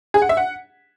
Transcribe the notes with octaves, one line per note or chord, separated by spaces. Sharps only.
G#4
F#5
E5
F#5